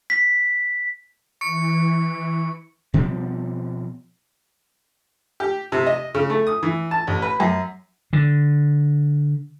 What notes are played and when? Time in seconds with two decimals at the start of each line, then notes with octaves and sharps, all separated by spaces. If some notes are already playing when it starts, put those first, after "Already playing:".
0.10 B6
1.41 E3 C#6 C#7
2.94 B2 F3 G3 C4
5.40 G4
5.72 C3
5.87 D#5
6.15 C#3
6.30 A3
6.47 D#6
6.63 E3
6.91 A5
7.07 A1
7.22 B4
7.40 F#2
8.13 D3